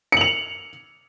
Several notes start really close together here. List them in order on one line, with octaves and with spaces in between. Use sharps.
C#7 F#7 F7